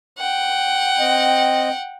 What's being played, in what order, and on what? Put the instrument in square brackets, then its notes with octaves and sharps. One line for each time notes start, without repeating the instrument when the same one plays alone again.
[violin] F#5 G5
[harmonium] C4 D#5